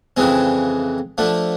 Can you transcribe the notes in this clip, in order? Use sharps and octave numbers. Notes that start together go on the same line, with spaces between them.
F2 C#3 E3 G#3 C4
D3 F3 A3